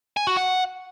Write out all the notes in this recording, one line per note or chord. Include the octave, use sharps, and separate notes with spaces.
G#5
F#4
F#5